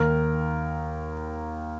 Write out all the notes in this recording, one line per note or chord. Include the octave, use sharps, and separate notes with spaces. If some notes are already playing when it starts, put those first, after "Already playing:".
Already playing: D#2 D#3 A#4